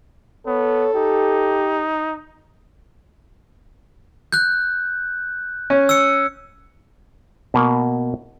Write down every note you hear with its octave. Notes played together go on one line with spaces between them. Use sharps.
B3 A4 C#5
D#4 G4
F#6 G6
C#4
E6 C#7
B2 A#3